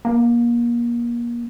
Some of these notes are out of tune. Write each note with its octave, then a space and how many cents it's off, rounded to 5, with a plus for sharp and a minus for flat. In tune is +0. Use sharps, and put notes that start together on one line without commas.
A#3 +30